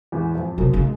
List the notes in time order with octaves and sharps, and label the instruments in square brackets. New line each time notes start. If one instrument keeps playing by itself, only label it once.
[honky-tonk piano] E2 E3
F2 F3
[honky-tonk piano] F#2 F#3 [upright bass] C3
[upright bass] C#3
[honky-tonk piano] G#3